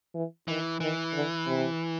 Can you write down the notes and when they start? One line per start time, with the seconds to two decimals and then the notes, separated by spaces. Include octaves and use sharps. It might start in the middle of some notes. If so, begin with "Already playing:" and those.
0.14 E3
0.48 D#3 E3
0.80 D#3 E3
1.14 D3
1.46 C3